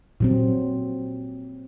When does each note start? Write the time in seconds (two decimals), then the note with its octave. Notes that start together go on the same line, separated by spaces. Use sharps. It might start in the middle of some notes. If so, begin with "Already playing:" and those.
0.20 A#2 F#3 C4